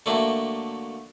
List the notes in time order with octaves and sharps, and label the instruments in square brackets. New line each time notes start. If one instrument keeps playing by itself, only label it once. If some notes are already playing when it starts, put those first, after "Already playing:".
[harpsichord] D3 F#3 A3 A#3 E4